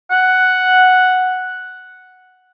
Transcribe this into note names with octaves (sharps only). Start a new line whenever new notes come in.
F#5